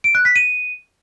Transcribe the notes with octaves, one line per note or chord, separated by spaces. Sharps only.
D7
F#6
B6
D#7